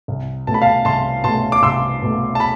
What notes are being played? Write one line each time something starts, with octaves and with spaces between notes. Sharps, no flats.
C2
B2 A3 A5
B5
F5 A5
C2 A5 C6
B2 A3 A5 C6
D6
C2 C6 E6
B2 A3
A5
B5